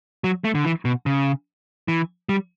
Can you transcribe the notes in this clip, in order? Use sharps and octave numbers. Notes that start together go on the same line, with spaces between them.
F#3
A3
D3
E3
B2
C#3
E3
G3